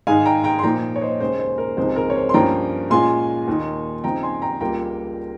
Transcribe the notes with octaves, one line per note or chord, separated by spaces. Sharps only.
G#2 D#3 G#3 D#4 F5 G#5
G5 A#5
G5 A#5
C6
A#2 F3 A#3 D#4 G5 A#5
C#5
C5 D#5
D#2 C#3 G#3 C5
C5
A#4
C#2 C3 F3 G#3 D#4 C5
A#4
C#5
C5
C6
G2 F3 A#3 C#4 G5 A#5
A#2 G#3 C#4 F4 G#5 C6
D#2 D#3 A#3 D#4
C#3 F3 C4 D#4 G5 A#5
G#5 C6
G5 A#5
C#2 C#3 G3 A#3 F4 G5 A#5